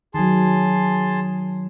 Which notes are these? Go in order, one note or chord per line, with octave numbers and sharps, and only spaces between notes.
D#3 F#3 G#4 A5 C6